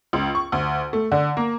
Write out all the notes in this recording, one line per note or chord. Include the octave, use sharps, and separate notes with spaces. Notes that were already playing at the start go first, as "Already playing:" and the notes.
C#2
C#6
D2
A3
D3
A#3